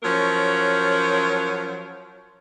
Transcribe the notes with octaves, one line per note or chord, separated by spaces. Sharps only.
F3 F#3 C#4 A#4 C#5